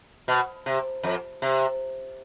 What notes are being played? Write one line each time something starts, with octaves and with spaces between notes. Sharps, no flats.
B2
C3
F2
C3